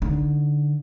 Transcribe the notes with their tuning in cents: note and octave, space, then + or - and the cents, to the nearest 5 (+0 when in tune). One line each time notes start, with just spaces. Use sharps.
D3 +0 D#4 +0